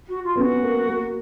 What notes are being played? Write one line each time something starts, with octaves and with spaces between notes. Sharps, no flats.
F#4
F4
B3
C#4 F#4
A#3
A#3